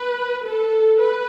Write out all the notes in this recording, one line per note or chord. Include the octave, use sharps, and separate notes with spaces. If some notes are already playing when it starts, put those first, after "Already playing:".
Already playing: B4
A4
B4